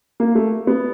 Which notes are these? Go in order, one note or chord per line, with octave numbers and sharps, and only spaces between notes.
A#3
A3
B3